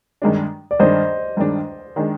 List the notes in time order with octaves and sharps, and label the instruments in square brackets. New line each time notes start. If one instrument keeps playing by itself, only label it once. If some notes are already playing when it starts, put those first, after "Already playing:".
[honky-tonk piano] G2 D#3 G#3 D4
[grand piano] D5
[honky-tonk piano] G2 D#3 G#3 D4 [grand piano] C5 D#5
[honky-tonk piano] G2 D#3 G#3 D4
D#3 G#3 D4